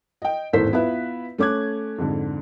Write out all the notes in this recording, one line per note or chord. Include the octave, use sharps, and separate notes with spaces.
D#5 G5
G#1 E2 A2 A4 C5 B6
B3 E4 F4 B4 E5
A3 C#4 D6 F#6 G#6
F2 G#2 D3